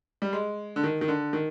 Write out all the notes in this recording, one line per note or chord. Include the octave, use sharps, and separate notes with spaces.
G3
G#3
D3
D#3
D#3
D3
D#3